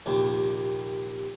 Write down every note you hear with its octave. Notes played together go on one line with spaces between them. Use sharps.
A#1 D#2 C3